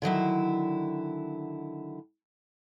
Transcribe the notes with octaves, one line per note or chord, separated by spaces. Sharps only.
D3 D#3 F#3 E4